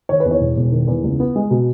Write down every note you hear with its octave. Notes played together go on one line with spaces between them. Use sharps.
D#3 C#5
B4
E2
C#5
E1
E1
D#3
E2
C#2
B3
G#3
B2